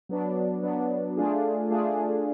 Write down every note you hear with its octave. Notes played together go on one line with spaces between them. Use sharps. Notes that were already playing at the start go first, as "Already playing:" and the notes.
F#3 B3 D4
F#3 B3 D4
A3 D4 F4 G#4
A3 D4 F4 G#4